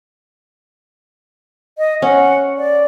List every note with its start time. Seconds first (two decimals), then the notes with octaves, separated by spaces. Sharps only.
1.78 D#5
2.02 C#4 F#5
2.57 D5